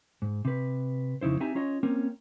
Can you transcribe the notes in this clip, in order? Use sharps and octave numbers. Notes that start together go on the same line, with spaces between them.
G#2
C3 B4
F2 C#3 D#4 E4 C5
C4 D#4 G4 E5 G#5 A#5
C#4 F4 C#5 D#5
A#3 C4 C#4 A#4